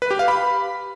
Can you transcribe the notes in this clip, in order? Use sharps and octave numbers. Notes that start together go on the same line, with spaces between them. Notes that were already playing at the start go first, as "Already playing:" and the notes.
B4
G4
F5
B5